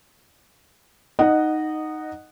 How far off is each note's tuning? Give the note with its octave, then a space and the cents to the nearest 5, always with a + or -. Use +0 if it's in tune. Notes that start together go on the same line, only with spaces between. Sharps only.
D#4 +0 D#5 -15 F#5 +0